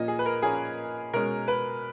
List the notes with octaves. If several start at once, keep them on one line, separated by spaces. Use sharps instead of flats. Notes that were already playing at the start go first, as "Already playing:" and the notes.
Already playing: A#2 F3 A#3 C#4 D#5
G#4
B4
A#4
A#2 F3 A#3 C#4 G#4
B2 G#3 C#4 A#4
B4